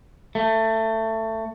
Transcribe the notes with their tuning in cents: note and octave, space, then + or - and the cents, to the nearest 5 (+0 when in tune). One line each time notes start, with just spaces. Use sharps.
A3 +20